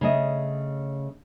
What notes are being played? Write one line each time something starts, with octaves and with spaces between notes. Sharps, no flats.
C#3 A3 D#5